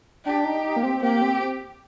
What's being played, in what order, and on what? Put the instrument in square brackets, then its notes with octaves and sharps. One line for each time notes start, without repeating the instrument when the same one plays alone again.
[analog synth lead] D4 [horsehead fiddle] G4
[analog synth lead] D#4
D#4
A#3
C4
[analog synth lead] A#3 [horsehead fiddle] G4
[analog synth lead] C4